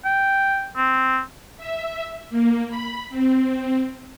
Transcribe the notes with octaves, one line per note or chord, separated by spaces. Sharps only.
G5
C4
E5
A#3
B5
C4